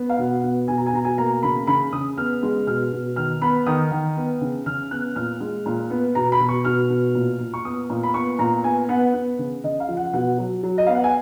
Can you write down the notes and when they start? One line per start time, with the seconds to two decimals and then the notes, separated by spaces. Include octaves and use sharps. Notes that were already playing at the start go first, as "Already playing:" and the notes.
Already playing: B3
0.09 F5
0.18 B2 F#5
0.43 B3
0.68 B2 G#5
0.77 A#5
0.86 G#5
0.93 B2 A#5
1.05 G#5
1.18 A#3 A#5
1.43 C#3 B5
1.67 C#3 B5
1.93 C#3 D#6
2.17 B3 F6
2.43 G#3
2.67 B2 F6
2.92 B2
3.16 D#3 F6
3.41 B3 B5
3.66 D#3 D#6
3.91 D#3
4.16 B3
4.41 C#3
4.66 C#3 F6
4.91 B3 F#6
5.16 A#2 F6
5.40 G#3
5.66 A#2
5.90 B3
6.15 B2 A#5
6.32 B5
6.40 B2
6.49 C#6
6.65 B2 F6
6.89 B2
7.15 A#2
7.40 A#2
7.54 C#6
7.65 B3 D#6
7.90 A#2
8.03 B5
8.14 B3 C#6
8.39 A#2 A#5
8.64 B3 G#5
8.89 B3 F#5
9.14 B3
9.39 C#3
9.63 C#3 D#5
9.80 F5
9.88 F3
9.97 F#5
10.13 B2 F#5
10.38 F#3
10.63 F#3
10.78 D#5
10.86 B3 F5
10.95 F#5
11.04 G#5